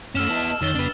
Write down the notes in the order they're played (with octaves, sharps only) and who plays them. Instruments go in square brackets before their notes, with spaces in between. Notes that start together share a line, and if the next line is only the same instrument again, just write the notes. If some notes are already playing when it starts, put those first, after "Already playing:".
[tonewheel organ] F#2 [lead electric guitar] A3 C#4 [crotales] E6 F6 E7
[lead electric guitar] B3 E4 [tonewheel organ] D#5 A5
[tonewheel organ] F2 C#5 [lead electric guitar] D#3 [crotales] E6 A6 G7
[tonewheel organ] F2 C#3 B3 [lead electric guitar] D4 B4